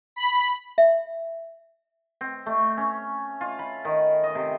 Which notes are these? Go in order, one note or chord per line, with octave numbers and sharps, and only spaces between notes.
B5
E5
C4
A3
C#4
F4
B5
D#3
D#5
C3